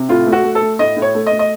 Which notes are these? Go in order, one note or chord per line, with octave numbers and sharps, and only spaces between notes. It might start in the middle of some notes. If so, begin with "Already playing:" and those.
Already playing: C3
A2 F4
A3
F#4
A3
A4
A3
A2 D#5
A2
C#5
A3
D#5
A3
D#5